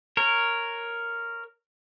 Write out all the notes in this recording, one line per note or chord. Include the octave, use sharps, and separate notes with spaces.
A#4 C#5